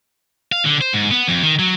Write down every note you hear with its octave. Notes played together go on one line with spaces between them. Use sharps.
F5
D3
C5
G#2
B3
F2
D#3
F#3